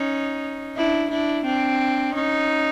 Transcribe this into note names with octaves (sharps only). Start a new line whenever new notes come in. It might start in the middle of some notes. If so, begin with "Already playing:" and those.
Already playing: C#4 D#4
D4 E4
D4 E4
C4 D4
C#4 D#4